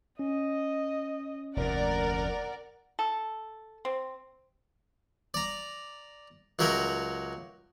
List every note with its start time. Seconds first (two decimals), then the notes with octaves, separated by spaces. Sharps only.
0.19 C#4 D#5
1.56 F1 D2 A#2 A#4 D5 F#5
2.99 A4
3.85 C4
5.34 D5 A#5
6.59 C#2 F#3 A#4 E5 G5 B5